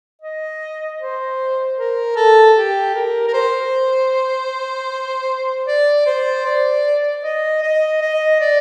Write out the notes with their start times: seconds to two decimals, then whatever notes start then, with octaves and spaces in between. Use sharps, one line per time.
0.21 D#5
0.99 C5
1.77 A#4
2.16 A4
2.56 G4
2.94 A#4
3.28 A#4
3.33 C5
5.67 D5
6.06 C5
6.45 D5
7.23 D#5
7.62 D#5
8.01 D#5
8.41 D5